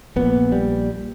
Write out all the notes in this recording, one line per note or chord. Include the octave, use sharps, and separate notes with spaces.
A#1 A#2 B3
G3